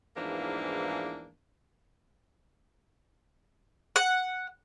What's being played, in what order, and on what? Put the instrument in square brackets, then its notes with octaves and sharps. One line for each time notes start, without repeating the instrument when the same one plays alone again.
[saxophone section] E2 G#2 E3 F3 A#3 D4
[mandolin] F#5